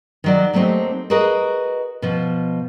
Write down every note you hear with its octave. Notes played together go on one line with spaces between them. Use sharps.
D#3 F#3 D5
F#3 A3 A#3 C4 D#4 G4
F#4 G#4 A#4 B4 D#5
B2 F3